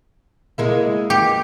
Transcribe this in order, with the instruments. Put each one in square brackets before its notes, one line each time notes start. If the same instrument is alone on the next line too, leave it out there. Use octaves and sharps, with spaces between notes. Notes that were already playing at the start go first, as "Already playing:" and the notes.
[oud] G#3 A#3 E4
[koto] G4